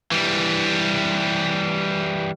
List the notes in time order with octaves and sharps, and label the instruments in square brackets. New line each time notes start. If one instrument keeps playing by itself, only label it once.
[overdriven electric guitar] E3 G3